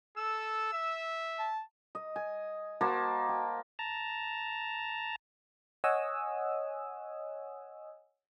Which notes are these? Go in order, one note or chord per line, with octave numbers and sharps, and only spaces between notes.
A4 E6
E5
A5
D#5
G#5
A#3 F#4 C5 A5
G5
A5 A#5
C#5 D#5 F#5 G#5 D#6 E6